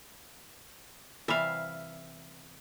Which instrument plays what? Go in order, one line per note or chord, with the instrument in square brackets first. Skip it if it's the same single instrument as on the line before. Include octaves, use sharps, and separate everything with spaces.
[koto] C3 E3 G3 [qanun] E5 F5